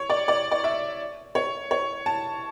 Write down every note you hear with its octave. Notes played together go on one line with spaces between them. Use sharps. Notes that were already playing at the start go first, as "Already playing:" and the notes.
Already playing: C#5
D5
D5
D5
E5
C#5
C#5
A5